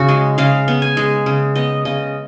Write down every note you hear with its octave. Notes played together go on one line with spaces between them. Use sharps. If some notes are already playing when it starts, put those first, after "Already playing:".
Already playing: C#3 F#4
G#3
C#3 F5
B3
G#5
G#3
C#3
B3 D#5
C#3 D#5